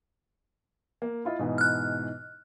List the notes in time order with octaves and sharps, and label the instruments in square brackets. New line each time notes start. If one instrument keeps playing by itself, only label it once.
[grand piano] A#3
E4 F4 D#5
G#2 B2 E3
[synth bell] F6 F#6